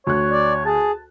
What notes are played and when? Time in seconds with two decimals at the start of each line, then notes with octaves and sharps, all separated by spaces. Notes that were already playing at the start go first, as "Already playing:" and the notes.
0.07 D2 C#5 F#6
0.31 D5
0.65 G#4 A5